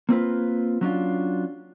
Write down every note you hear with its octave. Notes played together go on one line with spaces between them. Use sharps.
A#3 C4 F4 B4
F#3 C#4 D4 F4